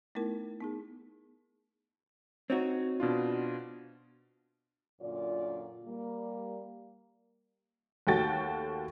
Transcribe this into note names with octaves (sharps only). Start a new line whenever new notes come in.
A3 B3 D#4 E4 A#4
B3 D#4 G#4
C4 D#4 F#4 C#5
B2 D4 F4
F#2 A#2 D3 F4 D5
G3 A#3
D#2 A3 F#4 G5 A6